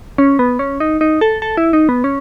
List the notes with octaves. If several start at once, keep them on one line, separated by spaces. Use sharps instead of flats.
C#4
B3
C#4
D#4
D#4
A4
A4
E4
D#4
B3
C#4